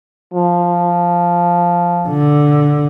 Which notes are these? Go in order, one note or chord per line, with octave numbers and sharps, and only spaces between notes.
F3
D3